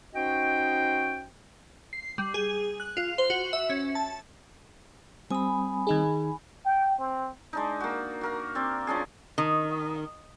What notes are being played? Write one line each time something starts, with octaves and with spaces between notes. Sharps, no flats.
C#4 D#4 F#4 C5 D#5 G5
C7
G3
G#4
F#6
F4
C5
F#4
E5
C#4
A5
G3 C4 G#5 B5 D#6
D#3 D#4 G#4
G5
C4
G#3 D4 D#4
A#3 F#4
F#4 A#4 F5
C4 D5
F3 C#4 D4 G#4
D#3